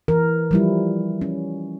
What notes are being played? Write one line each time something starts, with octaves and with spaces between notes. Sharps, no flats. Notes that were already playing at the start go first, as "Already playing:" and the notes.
E3 A#4
F3 G3 E4
C#4